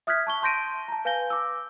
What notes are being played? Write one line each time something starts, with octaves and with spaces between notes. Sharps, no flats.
E5 D#6 F6 F#6 G#6 B6
A5 C#6 G7
A5 C6 G6 A#6 D7 D#7
A5 A#5
B4 F5 G#5 G6 A#6 G7
D6 E6